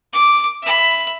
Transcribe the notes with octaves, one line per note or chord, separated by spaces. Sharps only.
D6
E5 B5